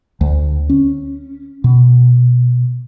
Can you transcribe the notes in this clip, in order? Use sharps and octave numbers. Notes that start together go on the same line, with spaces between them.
D2
C#4
B2